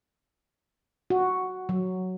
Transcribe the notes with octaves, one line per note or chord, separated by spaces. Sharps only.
F#4
F#3